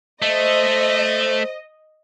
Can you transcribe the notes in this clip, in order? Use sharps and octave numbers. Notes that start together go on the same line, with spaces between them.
A3 C5 D#5